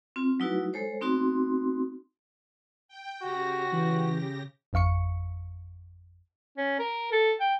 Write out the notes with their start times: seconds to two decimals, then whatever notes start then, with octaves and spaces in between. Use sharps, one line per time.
0.16 C4 F4
0.40 F#3 A3 D#4 E4 F#4 B4
0.73 G#3 A4 C5 C#5
1.01 A3 B3 C4 D#4 F#4 C6
2.88 G5
3.22 C#3 F#4 G4 A#6
3.73 E3
4.73 G#1 F2 F5 C#6 C#7
6.58 C#4
6.79 A#4
7.12 A4
7.40 G5